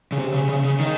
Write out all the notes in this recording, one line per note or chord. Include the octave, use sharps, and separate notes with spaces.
C#3
C3
C#3
C#3
C#3
D#3